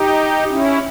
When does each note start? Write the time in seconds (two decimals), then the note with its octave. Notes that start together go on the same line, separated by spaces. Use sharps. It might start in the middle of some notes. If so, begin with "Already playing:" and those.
Already playing: D#4 G4
0.50 C#4 E4